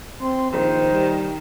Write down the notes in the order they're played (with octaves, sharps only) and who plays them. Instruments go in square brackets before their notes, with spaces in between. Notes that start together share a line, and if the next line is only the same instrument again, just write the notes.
[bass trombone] C4 [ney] C6
[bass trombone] A#1 [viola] D#3 [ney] C5
[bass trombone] G3